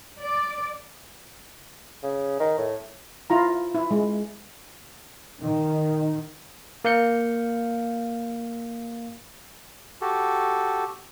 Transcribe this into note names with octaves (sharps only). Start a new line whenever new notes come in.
D5
C#3
D#3
A2
E4 F4 A#5
E4
G#3
D#3
A#3 F5 G6 C#7
F#4 G4 A4